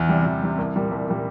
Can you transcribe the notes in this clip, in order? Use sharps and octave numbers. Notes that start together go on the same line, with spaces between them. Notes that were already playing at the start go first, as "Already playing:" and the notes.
Already playing: E2
C3 G3
E2
C3 G3
C2
A#2 G3
C2
A#2 G3